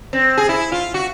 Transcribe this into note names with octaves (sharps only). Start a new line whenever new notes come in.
C4
G#4
E4
F4
F#4